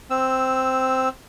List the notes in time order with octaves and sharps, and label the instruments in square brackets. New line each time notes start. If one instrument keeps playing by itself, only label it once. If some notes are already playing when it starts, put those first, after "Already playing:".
[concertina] C4 E6